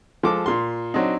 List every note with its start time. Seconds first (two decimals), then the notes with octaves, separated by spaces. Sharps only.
0.23 F3 G#3 A4 D6
0.46 A#2 C6
0.94 F#3 C4 D4 D#4